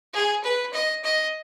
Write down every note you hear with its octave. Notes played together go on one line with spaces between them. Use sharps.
G#4
B4
D#5
D#5